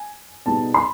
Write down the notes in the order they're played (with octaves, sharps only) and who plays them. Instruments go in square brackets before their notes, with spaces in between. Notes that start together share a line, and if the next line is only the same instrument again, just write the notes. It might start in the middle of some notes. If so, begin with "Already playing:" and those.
Already playing: [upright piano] G#5
[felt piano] B2 G3 B3 D#4 G#4 [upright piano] A5
[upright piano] C6
B5